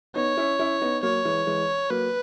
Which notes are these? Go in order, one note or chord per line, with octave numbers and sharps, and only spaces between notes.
B3 D#4 C#5
C#4 E4
C#4 E4
B3 D#4
F#3 A#3 C#5
E3 G#3
E3 G#3
F#3 A#3 B4